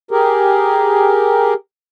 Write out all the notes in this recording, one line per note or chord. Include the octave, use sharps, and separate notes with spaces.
G4 G#4 A#4